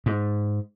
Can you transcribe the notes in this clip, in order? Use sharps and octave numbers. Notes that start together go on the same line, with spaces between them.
G#2